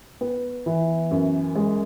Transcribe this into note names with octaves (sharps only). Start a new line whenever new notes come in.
B3
E3
F#2
G#3